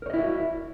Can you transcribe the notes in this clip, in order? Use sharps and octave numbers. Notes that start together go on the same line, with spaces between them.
E4 F#4 A#4 C#5 D#5